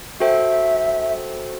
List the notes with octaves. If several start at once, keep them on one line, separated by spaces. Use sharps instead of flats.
F#4 A4 C5 E5 G5